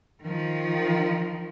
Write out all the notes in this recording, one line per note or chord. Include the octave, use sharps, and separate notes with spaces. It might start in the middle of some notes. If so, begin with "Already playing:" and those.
D#3 F3